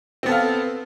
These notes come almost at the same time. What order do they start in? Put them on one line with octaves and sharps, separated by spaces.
C4 B3 A4 F5